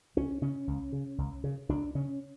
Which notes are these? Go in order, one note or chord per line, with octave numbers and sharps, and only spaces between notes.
C#2 C#4
C#3 C#4
C#2
C#3
C#2
C#3
C#2 D4
C#3 C#4